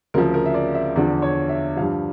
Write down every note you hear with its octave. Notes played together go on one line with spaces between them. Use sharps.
D2 C#3 F3 A#4
A#4
E5
D5
E5
E2 D3 F3 D5
C#5
E5
G2 D3 F3 F5